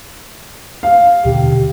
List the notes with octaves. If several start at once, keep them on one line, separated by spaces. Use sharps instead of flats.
F5
D#2 B2 D3 G4